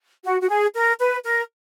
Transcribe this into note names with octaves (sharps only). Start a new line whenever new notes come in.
F#4
F#4
G#4
A#4
B4
A#4